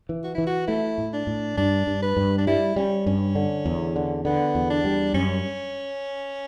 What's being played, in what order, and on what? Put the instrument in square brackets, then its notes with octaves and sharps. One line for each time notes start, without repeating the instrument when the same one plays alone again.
[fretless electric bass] E3
[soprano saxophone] F#4
[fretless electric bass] E3 [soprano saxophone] E4
[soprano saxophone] F#4
[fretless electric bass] A3 [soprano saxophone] E4
[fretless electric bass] A2
[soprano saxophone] D4
[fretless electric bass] A2
[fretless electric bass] G2 [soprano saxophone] D4
[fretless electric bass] G2
[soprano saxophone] B4
[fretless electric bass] G2
[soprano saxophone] D4
[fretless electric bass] G3 [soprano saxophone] E4
[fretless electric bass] G3 [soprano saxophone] C#4
[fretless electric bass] G2 [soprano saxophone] C#4
[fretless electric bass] D3
E2
D3
[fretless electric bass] D3 [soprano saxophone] B3
[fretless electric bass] E2
[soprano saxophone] D4
[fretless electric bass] G3
[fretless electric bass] F#2 [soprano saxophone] C#4